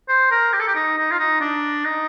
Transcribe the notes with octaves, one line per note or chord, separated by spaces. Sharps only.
C5
A#4
G4
A4
G4
D#4
D#4
F4
D#4
D4
D#4